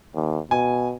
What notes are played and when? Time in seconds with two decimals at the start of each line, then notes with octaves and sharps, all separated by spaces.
0.15 D#2
0.51 B2 G#5